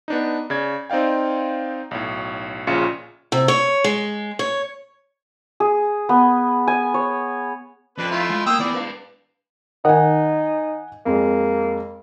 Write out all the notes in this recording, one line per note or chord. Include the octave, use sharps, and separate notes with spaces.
B3 D4 D#4
C#3 D5 G#6
C4 D#4 D5 F5 G5
B1 A2
A#1 C#3 C#4 F4 C#7
C3
C#5
G#3
C#5
G#4
B3
G#5
C#5
F2 D4 B4
A3 E4 F4
G#3
A#3 G5 D#6 E6
B3 E4 D5
B4 F5
D#3 D#4 F#5 G#5
F2 G#3 A#3